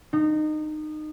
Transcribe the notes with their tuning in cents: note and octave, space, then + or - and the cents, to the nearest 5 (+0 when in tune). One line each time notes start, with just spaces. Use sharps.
D#4 -25